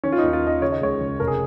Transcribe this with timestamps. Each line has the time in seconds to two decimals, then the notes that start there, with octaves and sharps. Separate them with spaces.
0.04 D#3 C#4
0.12 F4
0.18 D#2 D#4
0.33 F4
0.42 D#3 D#5
0.61 C#3 C#5
0.72 D#5
0.81 C#2 C#5
1.01 C#3
1.20 F1 A#4
1.27 G#4